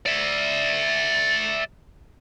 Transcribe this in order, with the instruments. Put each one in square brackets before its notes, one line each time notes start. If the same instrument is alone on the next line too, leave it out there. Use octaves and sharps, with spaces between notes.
[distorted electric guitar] D5 E5